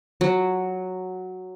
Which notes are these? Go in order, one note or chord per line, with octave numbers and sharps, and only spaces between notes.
F#3